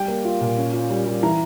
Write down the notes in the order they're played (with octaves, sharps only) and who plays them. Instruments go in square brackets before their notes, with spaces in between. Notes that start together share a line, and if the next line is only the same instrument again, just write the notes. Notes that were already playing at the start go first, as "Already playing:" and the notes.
Already playing: [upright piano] G3 G5
A#3
F4
A#2
C#4
F4
G3
G3
E3 A#5